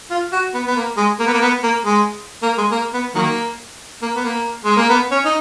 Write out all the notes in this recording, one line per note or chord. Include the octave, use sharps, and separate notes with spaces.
F4
F#4
B3
B3
A#3
G#3
A#3
B3
A#3
B3
A#3
G#3
A#3
G#3
A#3
B3
D#3 F#3 A#3
A#3
B3
A#3
G#3
A#3
B3
C#4
D#4